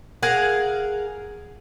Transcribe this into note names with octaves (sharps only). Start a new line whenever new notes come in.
G#4 A#4 F5 F#5